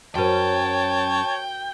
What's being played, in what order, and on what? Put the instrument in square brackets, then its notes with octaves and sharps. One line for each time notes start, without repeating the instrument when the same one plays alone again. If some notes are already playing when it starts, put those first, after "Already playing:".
[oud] F#2 C#4 [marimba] F#4 A#4 C5 [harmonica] C#5 A5 [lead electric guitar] G5